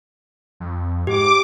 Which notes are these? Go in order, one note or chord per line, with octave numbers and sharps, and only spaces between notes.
F2
G#2 G4 D6